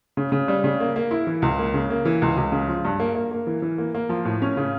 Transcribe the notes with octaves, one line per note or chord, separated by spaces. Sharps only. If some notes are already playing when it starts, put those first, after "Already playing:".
C#3
C#3
G3
C#3
A#3
A#3
E4
E3
C#2
A#3
C#3
A#3
E3
C#2
C#2
C#3
F3
G2
A#3
A#3
A#3
E3
E3
A#3
A#3
F3
A2
C#4
C#3